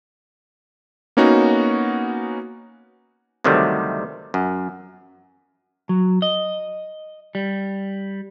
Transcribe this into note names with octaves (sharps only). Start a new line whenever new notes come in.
A#3 B3 C#4 D#4 F#4
D2 C3 D#3 F#3 G3 A3
F#2
F#3
D#5
G3